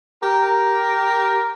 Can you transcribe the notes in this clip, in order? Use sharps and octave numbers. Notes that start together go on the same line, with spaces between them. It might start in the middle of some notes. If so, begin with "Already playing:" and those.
G4 A#4